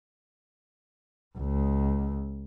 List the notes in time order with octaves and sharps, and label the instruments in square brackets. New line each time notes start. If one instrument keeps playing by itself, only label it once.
[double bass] C#2